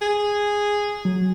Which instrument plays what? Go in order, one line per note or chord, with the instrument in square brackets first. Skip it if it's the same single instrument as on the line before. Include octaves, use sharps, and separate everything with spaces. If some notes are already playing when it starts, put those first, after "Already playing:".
[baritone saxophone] G#4
[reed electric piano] F#3